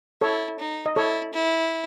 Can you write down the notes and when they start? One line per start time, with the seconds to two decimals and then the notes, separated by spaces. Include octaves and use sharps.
0.21 E4 A4 C#5
0.59 D#4
0.86 D#5
0.96 E4 A4 C#5
1.33 E4